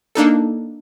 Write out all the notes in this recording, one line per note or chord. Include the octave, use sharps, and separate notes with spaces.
A#3 D4 D#4 A4